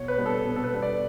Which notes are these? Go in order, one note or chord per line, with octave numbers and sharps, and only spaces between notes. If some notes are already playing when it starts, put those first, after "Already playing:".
Already playing: B2 C#5
B4
G3 B3 D4
A4
B2
A4
B4
G3 B3 D4
D5